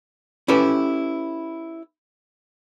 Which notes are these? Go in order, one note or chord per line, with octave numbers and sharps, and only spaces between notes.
C#4 E4 G4 A4 B4